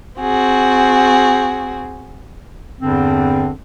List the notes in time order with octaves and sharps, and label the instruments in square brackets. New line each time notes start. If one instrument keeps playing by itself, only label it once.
[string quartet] C4 F#4 G#4
[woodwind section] E2 G2 D3 C4